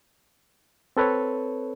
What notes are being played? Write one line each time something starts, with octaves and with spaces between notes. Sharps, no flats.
C4 A4 B4 C#5